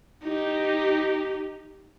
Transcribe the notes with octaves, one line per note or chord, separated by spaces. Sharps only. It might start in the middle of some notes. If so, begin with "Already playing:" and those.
D#4 G4